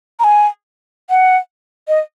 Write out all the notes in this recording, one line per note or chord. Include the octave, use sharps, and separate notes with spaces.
A#5
G#5
F#5
D#5